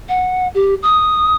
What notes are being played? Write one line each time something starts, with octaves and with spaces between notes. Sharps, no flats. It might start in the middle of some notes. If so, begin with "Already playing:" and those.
F#5
G4
D#6